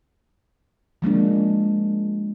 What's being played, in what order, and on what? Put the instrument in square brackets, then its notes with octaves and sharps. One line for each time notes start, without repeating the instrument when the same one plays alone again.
[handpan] F3 G#3 A#3 D4